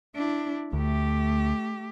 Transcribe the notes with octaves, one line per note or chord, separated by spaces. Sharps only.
D4 E4
D2 A3 G4